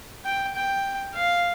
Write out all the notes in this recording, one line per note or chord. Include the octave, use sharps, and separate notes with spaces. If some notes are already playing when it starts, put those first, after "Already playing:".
G5
G5
F5